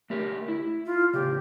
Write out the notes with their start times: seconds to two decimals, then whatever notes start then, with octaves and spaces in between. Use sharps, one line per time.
0.10 A3 G4 A#4
0.48 E4
0.86 F4
1.13 A2 C#3 G4